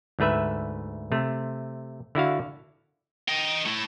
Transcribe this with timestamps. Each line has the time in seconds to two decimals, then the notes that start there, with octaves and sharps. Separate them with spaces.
0.19 D2 G#2 A3 B4 E5
1.12 C3 A3
2.15 D3 E4 F#4 F5
3.28 D#5 G5
3.65 A3 E4